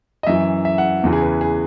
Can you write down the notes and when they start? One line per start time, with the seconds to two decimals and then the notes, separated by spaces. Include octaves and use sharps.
0.23 D#5
0.27 F#2 E3 E5
0.65 E5
0.78 F#5
1.04 E2 C#3 E3
1.13 G#4
1.21 B4
1.41 G#4